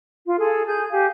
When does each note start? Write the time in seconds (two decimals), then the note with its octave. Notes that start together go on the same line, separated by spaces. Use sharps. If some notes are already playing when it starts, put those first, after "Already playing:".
0.25 F4
0.38 G#4 A4
0.66 G#4 G6
0.90 G4 F5 G#5